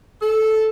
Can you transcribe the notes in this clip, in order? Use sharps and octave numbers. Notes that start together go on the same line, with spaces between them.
A4